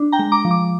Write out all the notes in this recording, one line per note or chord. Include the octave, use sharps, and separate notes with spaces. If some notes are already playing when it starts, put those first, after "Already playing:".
Already playing: D4
G5 A#5
G#3
A#5 D6
F3
D6